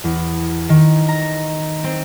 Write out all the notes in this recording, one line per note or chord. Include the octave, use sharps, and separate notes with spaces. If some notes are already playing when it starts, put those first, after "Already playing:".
E2
D#3
A#5
C4